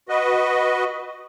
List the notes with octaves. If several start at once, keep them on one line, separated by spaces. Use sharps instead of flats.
F#4 B4 D#5